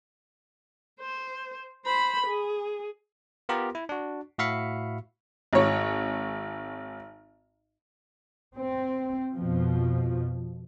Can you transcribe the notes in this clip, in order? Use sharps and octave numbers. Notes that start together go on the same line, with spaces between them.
C5
C5 B5
G#4
B3 F4 G4 A#4 A#5
E4
D4 F#4
A2 F#4 E5 F5 B5 C#7
G#1 C#5
C4
F2 B2 F3